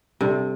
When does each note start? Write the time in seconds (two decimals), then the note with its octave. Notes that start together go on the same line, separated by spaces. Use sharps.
0.21 C3 G3 D4 A4 C5